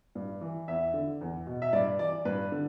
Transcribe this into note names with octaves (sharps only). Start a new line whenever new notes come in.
G2
E3
E2 E5
D3
E2
B2
E5
G2 D5
E3 D5
G2 B4
D3